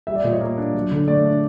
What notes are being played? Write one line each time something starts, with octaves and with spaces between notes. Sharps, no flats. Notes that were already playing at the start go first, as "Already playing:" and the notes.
G3 E5
D5
A#2 D#5
C#5
A#3
D4
F#3
D3
A3 D5
D4